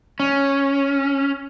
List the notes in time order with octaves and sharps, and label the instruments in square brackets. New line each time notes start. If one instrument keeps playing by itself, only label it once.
[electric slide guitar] C#4